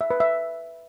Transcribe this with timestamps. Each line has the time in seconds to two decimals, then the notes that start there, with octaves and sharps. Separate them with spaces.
0.01 E5
0.10 B4
0.20 E5